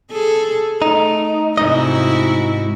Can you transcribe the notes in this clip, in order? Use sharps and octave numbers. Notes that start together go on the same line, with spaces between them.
G#4 A4
A3 D#4
G#2 C3 D#4 E4 F#4 D#5